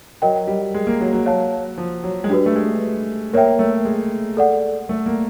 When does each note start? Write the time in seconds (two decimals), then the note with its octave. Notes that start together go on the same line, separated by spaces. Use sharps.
0.22 F#3 A#4 D#5 G5
0.47 G3
0.74 G#3
0.87 A#3
1.00 F#3
1.13 F#3
1.26 C#5 F5 A5
1.78 F3
2.04 F#3
2.24 G#3
2.29 G3 D4 F#4 B4
2.46 A3
2.56 G#3
3.33 A#3 A#4 C#5 E5 G5
3.59 A3
3.85 G#3
4.37 A4 D5 F#5
4.89 A3
5.06 A#3